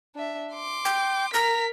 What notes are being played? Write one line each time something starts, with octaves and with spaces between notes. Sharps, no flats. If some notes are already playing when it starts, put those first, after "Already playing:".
D4 E5
C6 D6
G5
A#4 A#5 B6